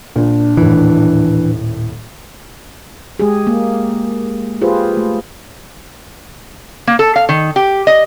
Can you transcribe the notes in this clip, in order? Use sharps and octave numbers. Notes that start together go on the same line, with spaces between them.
A#2 D4
D#1 A2 E3
G#3 G4 G#4
A#3
F4 G4 G#4 B4 C5
A3
A#3
A4
F5
D#3
G4
D#5